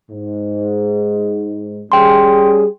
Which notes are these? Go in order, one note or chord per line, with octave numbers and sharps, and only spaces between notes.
G#2
G3 C#4 G#4 G5 C6